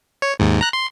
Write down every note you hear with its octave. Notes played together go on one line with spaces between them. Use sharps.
C#5
D#2 G#2
A#5 F#6
C6